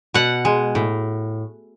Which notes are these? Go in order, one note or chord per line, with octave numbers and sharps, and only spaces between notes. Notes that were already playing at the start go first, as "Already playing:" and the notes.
B2 F#5
G#3
A2